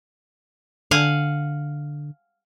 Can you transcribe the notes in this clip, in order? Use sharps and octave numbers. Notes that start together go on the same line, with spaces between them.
D3 F5 F#5 G#5